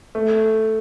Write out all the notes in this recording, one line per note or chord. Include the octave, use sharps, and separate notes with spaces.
A3